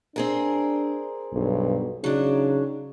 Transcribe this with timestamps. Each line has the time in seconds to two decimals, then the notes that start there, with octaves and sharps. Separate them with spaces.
0.16 C4 D4 G#4 A#4
1.33 B1 G2
2.04 C#3 F#3 D4 D#4